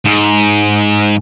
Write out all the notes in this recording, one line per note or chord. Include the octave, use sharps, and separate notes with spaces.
G#2